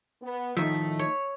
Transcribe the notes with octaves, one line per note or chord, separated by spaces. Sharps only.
B3
A2 D#3 F3 A3 D#4 E5
C#5